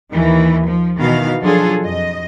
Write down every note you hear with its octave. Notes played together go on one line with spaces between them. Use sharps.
D#2 D#3 E3
F3
B2 D#3 E3 B3 F5
F3 F#3 D4 F4 G#4 A4
F2 D#5